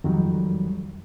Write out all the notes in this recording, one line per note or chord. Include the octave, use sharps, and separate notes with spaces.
F2 D#3 F#3 G3